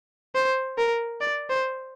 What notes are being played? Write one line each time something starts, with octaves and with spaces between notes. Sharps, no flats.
C5
A#4
D5
C5